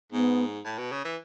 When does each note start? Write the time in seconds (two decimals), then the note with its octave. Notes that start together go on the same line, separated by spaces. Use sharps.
0.12 G#2 B3
0.65 A2
0.78 B2
0.92 C#3
1.04 E3